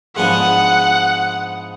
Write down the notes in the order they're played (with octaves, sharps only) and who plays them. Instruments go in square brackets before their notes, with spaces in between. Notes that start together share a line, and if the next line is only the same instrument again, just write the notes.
[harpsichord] G#2 F3 G#3 B3 D4 [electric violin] F#5